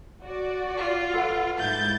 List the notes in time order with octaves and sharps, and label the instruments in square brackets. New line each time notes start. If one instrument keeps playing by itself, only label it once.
[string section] F#4 D5
[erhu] F4
[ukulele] A4 B4 F#5
[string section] G#2 E4 A6 [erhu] G6